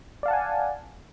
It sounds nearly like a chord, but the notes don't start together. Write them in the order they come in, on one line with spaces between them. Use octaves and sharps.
D5 F5 A5 F#5 G#5